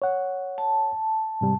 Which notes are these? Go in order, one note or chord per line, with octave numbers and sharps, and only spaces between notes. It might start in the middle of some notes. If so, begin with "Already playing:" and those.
C#5 F#5
A5
G#2 C3 G3